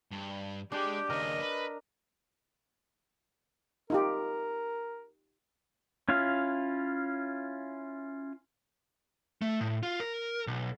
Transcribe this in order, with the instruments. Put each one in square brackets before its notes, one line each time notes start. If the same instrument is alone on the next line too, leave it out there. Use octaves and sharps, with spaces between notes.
[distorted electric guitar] G2
[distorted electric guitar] G#3 [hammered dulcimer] D4 [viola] G4 G5
[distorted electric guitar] D#2 C#3 [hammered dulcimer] A#4 [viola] D#5
[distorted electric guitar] B4
[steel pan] D#4 F4 G4 [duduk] A#4
[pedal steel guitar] C#4 E4 F4 F5
[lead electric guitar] A3
A2
F4
A#4
B1